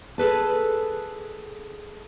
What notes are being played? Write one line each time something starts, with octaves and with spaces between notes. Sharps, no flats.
G#4 A4 B4 A5